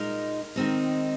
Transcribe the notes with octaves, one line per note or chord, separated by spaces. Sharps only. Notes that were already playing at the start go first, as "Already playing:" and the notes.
Already playing: A#2 G#3 D#4 A#4
D#3 G#3 C4 D#4